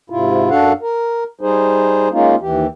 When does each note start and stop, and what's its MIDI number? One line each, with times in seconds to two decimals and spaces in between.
0.10 0.50 44
0.10 0.50 48
0.10 0.50 64
0.10 0.50 65
0.50 0.72 42
0.50 0.72 62
0.50 0.72 66
0.50 0.72 69
0.50 0.72 77
0.50 0.72 78
0.81 1.24 70
1.41 2.09 55
1.41 2.09 63
1.41 2.09 68
1.41 2.09 72
2.12 2.35 56
2.12 2.35 58
2.12 2.35 61
2.12 2.35 63
2.12 2.35 65
2.41 2.67 39
2.41 2.67 52
2.41 2.67 67